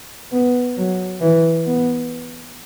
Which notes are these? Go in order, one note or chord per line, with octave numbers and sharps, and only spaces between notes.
B3
F#3
E3
B3